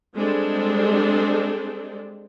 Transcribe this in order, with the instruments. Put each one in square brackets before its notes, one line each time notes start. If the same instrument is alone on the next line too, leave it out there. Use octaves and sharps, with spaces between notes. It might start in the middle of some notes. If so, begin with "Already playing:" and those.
[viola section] G3 G#3 C4 D4 A4